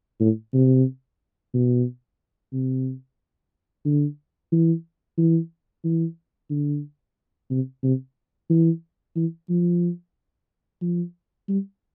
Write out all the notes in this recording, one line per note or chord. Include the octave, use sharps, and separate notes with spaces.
A2
C3
B2
C3
D3
E3
E3
E3
D3
C3
C3
E3
E3
F3
F3
G3